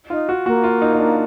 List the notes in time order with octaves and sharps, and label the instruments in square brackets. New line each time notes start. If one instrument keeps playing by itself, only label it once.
[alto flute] D#4 [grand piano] F4
[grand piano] F#4
[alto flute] A#3 [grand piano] F#4
[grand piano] F4
D#4
D#4
D4